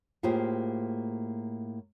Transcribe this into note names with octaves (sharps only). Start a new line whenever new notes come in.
A2 A#3 F4 G4 G#4 C5